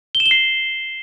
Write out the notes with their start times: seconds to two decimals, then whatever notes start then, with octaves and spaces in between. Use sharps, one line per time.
0.15 G7
0.20 E7
0.26 G7
0.31 C7